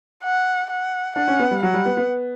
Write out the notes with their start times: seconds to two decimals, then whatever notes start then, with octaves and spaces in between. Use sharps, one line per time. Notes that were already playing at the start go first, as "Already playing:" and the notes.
0.24 F#5
0.70 F#5
1.16 D4 F#5
1.28 C#4
1.39 B3
1.51 G3
1.62 F#3 F#5
1.74 G3
1.85 B3
1.97 B3